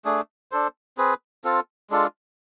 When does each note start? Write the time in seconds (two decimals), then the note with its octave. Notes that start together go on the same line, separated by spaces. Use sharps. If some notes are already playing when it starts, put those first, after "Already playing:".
0.05 A3 D4 G#4
0.52 D4 A4 C5
0.97 C4 G#4 B4
1.44 C4 F4 A4
1.90 G#3 D4 F4 A4